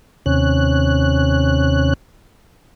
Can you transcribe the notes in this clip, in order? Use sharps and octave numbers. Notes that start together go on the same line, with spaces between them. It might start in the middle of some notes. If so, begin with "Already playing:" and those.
D#2 C3 C#4 F#6